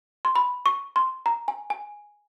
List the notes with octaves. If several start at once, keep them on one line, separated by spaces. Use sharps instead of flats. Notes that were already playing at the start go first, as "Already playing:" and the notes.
C6
B5
C#6
C6
A#5
G#5
G#5